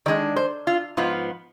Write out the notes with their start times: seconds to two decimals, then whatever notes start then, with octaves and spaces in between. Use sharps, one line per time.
0.06 D#3 G#3 D4 D5
0.36 C5
0.67 F4
0.97 G#2 F3 B3 F4